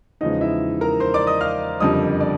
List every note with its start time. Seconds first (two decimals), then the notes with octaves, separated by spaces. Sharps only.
0.21 E2 C#3 F3 G#3 D#4 D#5
0.41 E4 E5
0.81 A#4 A#5
1.00 C5 C6
1.14 D5 D6
1.27 D#5 D#6
1.41 F5 F6
1.80 F#1 F2 D3 G3 D#5 D#6
2.20 D5 D6